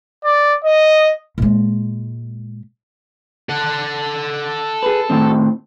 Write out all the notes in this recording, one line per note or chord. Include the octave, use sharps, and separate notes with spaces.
D5
D#5
A#2 G#3
A4 F#5
G#4 B4
A2 D#3 C4